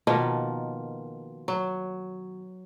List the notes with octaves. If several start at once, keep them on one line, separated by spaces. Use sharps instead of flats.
B2 D#3 F3 A#3
F#3